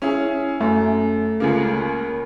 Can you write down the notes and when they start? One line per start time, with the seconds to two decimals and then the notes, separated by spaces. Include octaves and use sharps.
0.02 C#4 E4 G#4
0.61 F#2 A3
1.40 C#2 C#3 A#3